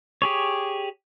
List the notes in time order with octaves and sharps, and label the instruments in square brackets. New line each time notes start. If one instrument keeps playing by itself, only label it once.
[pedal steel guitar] G4 G#4 C#5